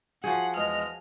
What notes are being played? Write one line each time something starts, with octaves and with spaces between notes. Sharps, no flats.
F3 F#4 G#4 F#5
E2 G#3 D#5 F6